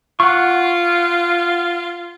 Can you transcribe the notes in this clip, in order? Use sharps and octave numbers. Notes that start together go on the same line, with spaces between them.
F4 F#5 C#6